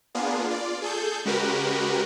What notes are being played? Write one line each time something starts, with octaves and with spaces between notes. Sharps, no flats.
A#3 B3 D4 F4 G#4
F4 D5
G#4 A4 G6
C#3 G#3 F#4 G4 A#4 B4